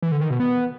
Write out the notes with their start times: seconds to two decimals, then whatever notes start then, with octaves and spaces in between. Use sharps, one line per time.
0.02 E3
0.12 D3
0.21 D#3
0.30 B2
0.40 B3